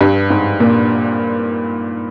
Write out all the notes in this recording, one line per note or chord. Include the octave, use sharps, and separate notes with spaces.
G2
G#2
A#2